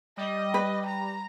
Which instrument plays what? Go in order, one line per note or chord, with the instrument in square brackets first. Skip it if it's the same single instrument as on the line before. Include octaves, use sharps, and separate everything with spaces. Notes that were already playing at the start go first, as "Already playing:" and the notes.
[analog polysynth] G3 [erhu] D#5
[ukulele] B4
[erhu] A#5